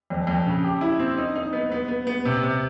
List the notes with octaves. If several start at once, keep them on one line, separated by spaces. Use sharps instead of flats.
F2
F2
C#3
G4
E4
C4
D#4
D#4
B3
B3
B3
B3
C3
C3